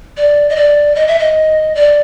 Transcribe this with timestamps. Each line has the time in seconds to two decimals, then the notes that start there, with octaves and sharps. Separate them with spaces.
0.17 D5
0.49 D#5
0.56 D5
0.95 D#5
1.07 E5
1.19 D#5
1.75 D5